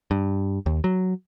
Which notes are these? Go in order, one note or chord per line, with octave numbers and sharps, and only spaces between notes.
G2
D#2
F#3